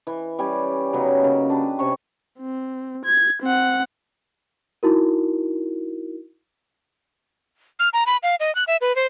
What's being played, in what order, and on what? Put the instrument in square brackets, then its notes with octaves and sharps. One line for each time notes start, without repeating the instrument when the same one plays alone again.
[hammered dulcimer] E3
G3 C#4 D5 G#5
C#3 F#3 B3 D#4
C#3 A#3
D4 G4 B4
C3 C#4 C#6
[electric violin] C4
G#6
C4 F#5
[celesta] D#4 E4 F#4 A#4
[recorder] F6
A#5
B5
F5
D#5
F#6
E5
B4
C5